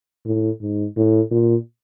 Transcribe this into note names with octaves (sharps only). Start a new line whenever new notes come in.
A2
G#2
A2
A#2